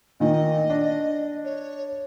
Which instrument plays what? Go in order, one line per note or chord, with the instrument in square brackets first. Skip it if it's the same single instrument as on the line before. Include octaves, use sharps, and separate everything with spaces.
[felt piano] A#2 D#3 [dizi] D#5
[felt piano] D4
[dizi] C#5